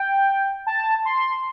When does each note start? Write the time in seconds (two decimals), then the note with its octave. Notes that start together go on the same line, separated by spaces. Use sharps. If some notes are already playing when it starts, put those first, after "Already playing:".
Already playing: G5
0.67 A5
1.05 C6